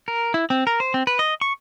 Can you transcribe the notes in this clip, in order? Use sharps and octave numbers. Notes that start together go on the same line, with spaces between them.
A#4
E4
C4
A#4
C5
C4
B4
D#5
C#6